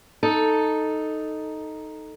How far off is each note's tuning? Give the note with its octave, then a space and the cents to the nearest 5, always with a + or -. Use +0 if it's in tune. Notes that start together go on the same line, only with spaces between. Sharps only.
D#4 +0 A4 +0